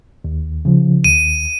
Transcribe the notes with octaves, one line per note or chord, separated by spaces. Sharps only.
D#2
C#3 F3
D#2 D#7